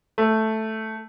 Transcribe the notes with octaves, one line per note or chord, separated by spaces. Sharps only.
A3